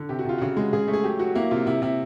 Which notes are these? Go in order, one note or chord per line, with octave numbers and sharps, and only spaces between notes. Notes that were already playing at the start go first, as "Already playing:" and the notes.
Already playing: D3
C3 G4
F#4
C3 F4
C#3 F#4
G#3
C#3 G#4
A3
G#4
F#3 G4
F#3 F#4
A#3 E4
C3 F4
C3 E4
C3 E4